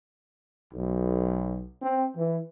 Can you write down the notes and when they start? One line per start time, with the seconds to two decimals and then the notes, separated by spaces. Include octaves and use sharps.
0.74 B1
1.82 C4
2.16 E3